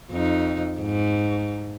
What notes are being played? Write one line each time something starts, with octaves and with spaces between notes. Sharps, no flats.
F2 D#4
G#2